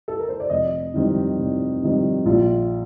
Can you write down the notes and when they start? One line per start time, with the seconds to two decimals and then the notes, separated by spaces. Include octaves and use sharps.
0.08 A4
0.19 A#4
0.29 C5
0.40 D5
0.50 F1 D#5
0.94 F2 D#3 G3 C4
1.39 F1
1.83 F2 D#3 G3 C4
2.26 A#1 F4